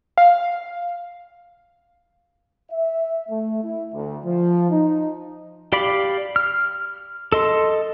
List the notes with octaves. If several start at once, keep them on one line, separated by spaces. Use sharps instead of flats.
F5
E5
A3
E4
D2
F3
D#4
G4 D5 F5 B5 D6
F6
A4 D#5 C6